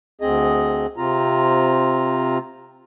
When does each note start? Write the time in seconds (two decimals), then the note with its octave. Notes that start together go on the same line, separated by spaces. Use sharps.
0.21 D2 C4 G#4 D#5
0.97 C3 C4 F4 A#5